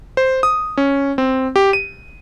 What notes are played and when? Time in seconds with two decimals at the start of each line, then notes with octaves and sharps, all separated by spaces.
0.17 C5
0.43 D#6
0.77 C#4
1.18 C4
1.56 G4
1.73 D#7